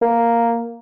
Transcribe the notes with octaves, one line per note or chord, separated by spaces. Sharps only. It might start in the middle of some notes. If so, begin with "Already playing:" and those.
A#3